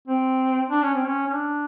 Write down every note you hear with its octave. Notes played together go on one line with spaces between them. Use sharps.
C4
D4
C#4
C4
C#4
C#4
D4